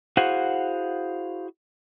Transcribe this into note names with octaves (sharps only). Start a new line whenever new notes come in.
E4 F#4 G#4 C5 F5 F#5